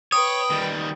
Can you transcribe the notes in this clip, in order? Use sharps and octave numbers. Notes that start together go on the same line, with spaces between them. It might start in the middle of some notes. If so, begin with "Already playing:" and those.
B4 C#5 G5 D#6
D#3 G3